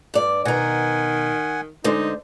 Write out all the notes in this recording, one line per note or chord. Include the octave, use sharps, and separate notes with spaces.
G2 D5
B2 D#3 F#5 G#5 A#5
D3 G#3 D#4 C5